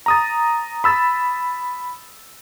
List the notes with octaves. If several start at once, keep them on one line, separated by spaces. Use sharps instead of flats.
A#5 D#6 A6
B5 E6 A6